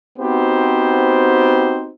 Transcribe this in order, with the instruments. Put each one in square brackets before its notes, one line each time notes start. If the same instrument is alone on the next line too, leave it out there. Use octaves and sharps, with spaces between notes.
[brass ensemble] B3 C4 D#4 F#4 G4 C5